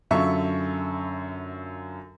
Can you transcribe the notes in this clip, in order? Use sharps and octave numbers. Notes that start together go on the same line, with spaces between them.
F#2 D3 F4 A4 E5 C#6